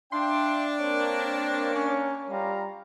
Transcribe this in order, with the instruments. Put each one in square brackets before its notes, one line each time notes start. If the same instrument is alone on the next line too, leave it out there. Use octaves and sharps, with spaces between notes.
[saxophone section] D4 [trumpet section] E5 F5 G5 [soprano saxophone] C6
[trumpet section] A#3 A#4 [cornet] C4 [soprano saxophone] C#5
[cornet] C#4
[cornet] G3 [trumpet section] F4 F5 A#5